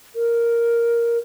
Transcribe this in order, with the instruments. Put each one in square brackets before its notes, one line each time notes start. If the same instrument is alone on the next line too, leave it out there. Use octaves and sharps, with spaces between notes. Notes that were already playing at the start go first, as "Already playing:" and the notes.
[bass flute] A#4